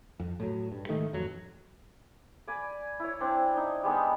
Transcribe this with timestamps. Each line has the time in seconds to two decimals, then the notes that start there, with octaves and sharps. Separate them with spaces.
0.20 F2
0.40 A2 F#3
0.72 G2
0.89 G#2 D#3 A3
1.13 A1 F2 F#3
2.47 D5 G#5 B5
3.00 E4 C#5
3.21 C4 D4
3.55 D4 D#4
3.84 G3 G#3 B3 D#4